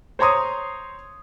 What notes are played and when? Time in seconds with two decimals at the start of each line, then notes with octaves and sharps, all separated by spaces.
0.19 C5 C#5 A#5 C6 D#6